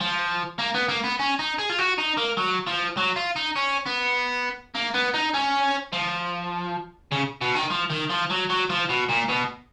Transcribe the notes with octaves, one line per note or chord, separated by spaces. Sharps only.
F3
A#3
B3
A#3
B3
C#4
D#4
G#4
F4
F#4
D#4
A#3
F#3
F3
F#3
F4
D#4
C#4
B3
A#3
B3
D#4
C#4
F3
C#3
B2
D#3
F3
D#3
F3
F#3
F#3
F3
B2
A#2
B2